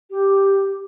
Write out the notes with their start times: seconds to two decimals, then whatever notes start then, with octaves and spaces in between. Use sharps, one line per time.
0.11 G4